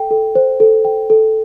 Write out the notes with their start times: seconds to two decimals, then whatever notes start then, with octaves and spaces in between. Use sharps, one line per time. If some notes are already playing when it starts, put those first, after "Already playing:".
Already playing: A4 G5
0.11 A4
0.35 C5
0.60 A4
0.85 G5
1.10 A4